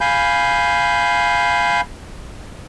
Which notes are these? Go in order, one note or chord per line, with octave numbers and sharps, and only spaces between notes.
F5 G#5 B5 G6